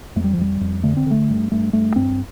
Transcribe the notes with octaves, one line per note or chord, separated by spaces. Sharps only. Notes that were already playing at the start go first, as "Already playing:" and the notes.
F2 A3
G3
F3
F2 G3
F2
D3 A3
C4
D3 A3
G2
G2 A3
G2 A3
G2 C4